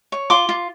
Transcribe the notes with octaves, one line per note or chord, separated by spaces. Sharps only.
C#5
F4 C6 D6
F4